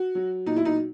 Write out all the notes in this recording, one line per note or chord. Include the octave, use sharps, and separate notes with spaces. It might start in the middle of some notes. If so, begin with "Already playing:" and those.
Already playing: F#4
F#3
A#2 D#4
E4
D#4